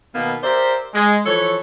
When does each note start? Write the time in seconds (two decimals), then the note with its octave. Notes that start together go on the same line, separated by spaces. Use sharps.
0.13 B2 D#3 A#3 B3
0.43 G4 A#4 C5 D5 E5
0.93 G#3
1.25 E3 F3 A4 C#5